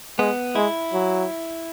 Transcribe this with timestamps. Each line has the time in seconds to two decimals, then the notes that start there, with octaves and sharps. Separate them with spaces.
0.18 G#3 B3
0.55 G#3 E4
0.93 F#3